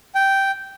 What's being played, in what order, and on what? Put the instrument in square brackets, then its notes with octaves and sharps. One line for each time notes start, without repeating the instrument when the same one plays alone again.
[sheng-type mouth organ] G5